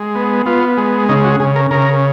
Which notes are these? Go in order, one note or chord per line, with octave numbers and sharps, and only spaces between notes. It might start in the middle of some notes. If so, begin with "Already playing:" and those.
Already playing: G#3
B3
B3 F4
G#3
C#3 D#4
F#4
C#3 G#4
A#4
C#3 A#4